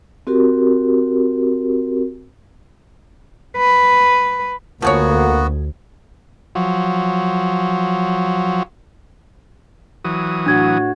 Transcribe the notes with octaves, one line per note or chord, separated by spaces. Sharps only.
C4 F#4 G4 A#4
B4
D2 F3 A#3 B3 F#4 G#4 C#5
F3 F#3
E3 F#3 D#6
A2 D4 F#4 G#6